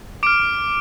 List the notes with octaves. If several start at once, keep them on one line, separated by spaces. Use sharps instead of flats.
D6 F6 D7